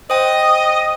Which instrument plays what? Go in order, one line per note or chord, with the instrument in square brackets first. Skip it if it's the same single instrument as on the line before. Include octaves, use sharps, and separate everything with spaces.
[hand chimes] C5 G5 [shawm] D#5 [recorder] D#6